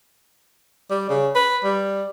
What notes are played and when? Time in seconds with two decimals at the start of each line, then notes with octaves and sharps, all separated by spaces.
0.90 G3
1.09 C#3
1.35 B4
1.64 G3